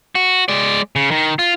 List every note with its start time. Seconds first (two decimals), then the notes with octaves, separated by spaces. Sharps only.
0.15 F#4
0.48 G#3 D5
0.96 C#3
1.11 D#3
1.39 F4